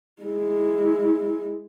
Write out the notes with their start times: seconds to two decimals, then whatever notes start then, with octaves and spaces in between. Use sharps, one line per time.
0.23 G#3 E4